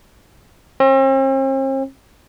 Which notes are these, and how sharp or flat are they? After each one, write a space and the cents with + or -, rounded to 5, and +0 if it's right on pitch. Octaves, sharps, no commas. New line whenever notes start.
C4 +45